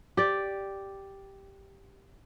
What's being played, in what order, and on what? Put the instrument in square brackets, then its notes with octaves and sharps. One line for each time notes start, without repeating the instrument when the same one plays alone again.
[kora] G4 D5